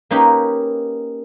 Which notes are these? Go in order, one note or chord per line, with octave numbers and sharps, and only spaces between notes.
A#3 C#4 D#4 G4 B4